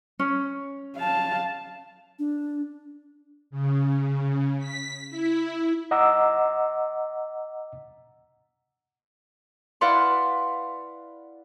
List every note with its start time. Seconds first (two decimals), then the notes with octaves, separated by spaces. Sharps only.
0.19 C#4
0.97 F5 A5
2.19 D4
3.50 C#3
4.58 B6
5.10 E4
5.91 D#5 F#5 A#5 D6 E6
9.81 E4 B4 D5 F5 F#5 C6